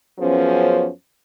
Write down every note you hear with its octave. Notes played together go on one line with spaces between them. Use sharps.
F#2 F3 B3 C#4 G#4 C5